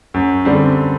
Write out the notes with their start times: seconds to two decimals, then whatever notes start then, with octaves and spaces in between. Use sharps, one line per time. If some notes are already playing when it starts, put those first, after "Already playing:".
0.14 F#2
0.45 D3 G3 C4